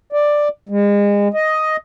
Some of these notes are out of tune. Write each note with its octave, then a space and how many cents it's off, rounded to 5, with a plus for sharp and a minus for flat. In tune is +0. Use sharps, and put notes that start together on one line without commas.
D5 +5
G#3 -35
D#5 +5